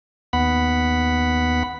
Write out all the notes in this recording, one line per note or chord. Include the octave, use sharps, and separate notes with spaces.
D#2 B3 F#5 B5